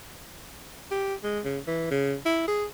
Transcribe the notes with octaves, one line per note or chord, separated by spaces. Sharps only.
G4
G#3
C#3
E3
C#3
E4
G#4